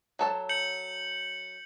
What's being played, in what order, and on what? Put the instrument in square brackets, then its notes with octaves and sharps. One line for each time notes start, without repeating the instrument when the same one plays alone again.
[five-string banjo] F#3 A4 A5
[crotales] G6 C#7 F#7